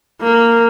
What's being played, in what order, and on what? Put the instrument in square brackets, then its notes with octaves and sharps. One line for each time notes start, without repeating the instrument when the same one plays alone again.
[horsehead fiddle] A#3